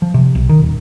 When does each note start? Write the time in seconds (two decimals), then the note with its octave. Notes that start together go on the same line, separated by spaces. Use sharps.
0.02 F3
0.14 C3
0.35 B1
0.49 D#3
0.62 D#1